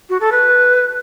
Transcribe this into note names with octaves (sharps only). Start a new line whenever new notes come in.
F#4
A4
B4